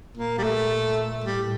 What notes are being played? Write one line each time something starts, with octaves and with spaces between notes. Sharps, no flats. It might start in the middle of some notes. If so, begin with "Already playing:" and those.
A#2 A#3
G3
A3
A2 G3